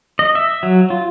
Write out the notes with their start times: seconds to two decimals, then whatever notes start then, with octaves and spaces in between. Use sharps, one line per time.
0.19 D#5
0.35 E5
0.63 F#3
0.90 F4